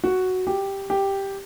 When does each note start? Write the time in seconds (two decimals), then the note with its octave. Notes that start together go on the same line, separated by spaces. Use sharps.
0.04 F#4
0.47 G4
0.90 G4